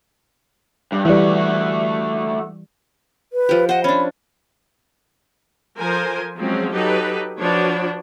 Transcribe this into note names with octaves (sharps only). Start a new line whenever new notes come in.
G2
E3 G3 A3 F#4
B4
F3 G4
C5 D#5 F#5
C#4 D4 B5
F3 A4 A#4 C5 G#5
F3 F#3 G#3 C4 C#4
F#3 D#4 G4 A4 B4
F3 D4 F#4 B4 C#5